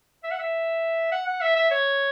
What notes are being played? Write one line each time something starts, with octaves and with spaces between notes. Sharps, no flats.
E5
F#5
E5
F#5
F#5
E5
E5
C#5